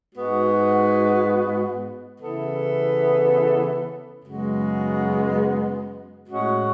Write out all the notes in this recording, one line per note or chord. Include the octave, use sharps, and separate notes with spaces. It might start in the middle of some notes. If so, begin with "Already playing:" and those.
G#2 G#3 B3 F#4
C#3 E3 B3 E4 A4
F#2 C#3 G#3 B3 F#4
A2 G#3 C#4 F#4